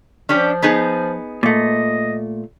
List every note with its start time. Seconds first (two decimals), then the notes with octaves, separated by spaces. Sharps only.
0.29 F3 C#4 D4 G4
0.62 B3 D#4 G#4
1.43 A#2 A3 D#5